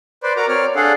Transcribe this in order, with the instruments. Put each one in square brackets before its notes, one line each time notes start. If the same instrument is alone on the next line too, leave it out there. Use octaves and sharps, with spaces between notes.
[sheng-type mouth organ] B4 C5 D5
F#4 A#4 A#5 D6
C4 C#5 D5 F6
D4 G#4 A4 F5 F#5